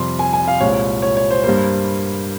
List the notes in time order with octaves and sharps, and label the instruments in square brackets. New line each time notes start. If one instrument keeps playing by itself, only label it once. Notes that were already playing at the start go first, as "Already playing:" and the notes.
Already playing: [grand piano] F2 C3 G3 C6
G#5
G#5
F5
C2 A#2 G#3 C4 C#5
C#5
C#5
C5
G2 G3 A#3 C5